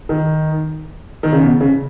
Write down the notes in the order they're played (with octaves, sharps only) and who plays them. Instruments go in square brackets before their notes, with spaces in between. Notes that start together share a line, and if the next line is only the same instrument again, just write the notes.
[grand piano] D#3
D#3
C#3
B2
C#3